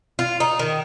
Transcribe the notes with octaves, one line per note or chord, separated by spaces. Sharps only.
F4
D#4
D#3